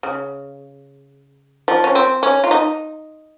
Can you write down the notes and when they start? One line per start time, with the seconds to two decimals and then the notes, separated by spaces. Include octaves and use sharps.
0.03 C#3
1.68 F3
1.84 C#4
1.95 C4
2.23 C#4
2.44 F4
2.51 D#4